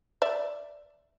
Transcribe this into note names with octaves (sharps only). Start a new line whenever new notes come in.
D5 E5